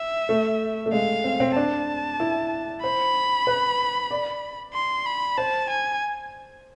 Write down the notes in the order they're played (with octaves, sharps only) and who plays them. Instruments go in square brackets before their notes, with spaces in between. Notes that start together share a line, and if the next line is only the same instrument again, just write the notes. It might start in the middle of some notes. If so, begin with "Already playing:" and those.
Already playing: [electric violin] E5
[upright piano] A3
A3
[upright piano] G#3 [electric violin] F5
[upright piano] C4
C4
[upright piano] D4 [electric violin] A5
[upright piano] E4
[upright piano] C5 [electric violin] B5
[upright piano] B4
D5
[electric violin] C6
B5
[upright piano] C5 [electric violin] A5
[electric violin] G#5